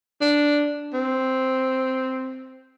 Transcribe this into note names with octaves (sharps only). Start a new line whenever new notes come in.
D4
C4